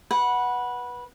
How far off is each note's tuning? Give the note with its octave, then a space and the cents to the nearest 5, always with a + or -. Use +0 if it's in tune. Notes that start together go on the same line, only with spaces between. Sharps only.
B4 -15 F#5 +0